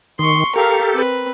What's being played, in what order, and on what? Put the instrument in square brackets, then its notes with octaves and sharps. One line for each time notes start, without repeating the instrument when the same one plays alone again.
[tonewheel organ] D#3 [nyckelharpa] C6 C#6
[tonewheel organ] G4 A4 [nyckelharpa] A#4 F5
[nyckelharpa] C4 B4